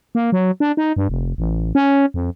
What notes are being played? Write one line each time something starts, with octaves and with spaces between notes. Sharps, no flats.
A#3
F#3
D4
D#4
G2
F1
A1
C#4
F2